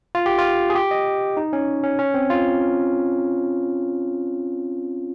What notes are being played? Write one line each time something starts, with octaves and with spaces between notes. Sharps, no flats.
F4
G4
F4
G#4
G4
D#5
D#4
C#4
C#4
C#4
C4
F4